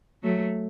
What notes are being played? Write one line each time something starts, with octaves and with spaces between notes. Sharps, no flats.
F#3 A3